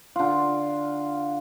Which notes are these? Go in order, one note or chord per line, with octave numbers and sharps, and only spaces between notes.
D3 F4